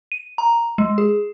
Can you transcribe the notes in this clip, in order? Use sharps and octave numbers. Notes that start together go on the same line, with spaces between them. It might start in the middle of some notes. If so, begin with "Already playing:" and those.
D#7
A#5
G#3
G#4